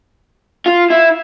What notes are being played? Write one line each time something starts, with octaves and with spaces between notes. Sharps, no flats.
F4
E4